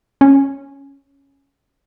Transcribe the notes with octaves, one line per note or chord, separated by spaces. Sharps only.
C#4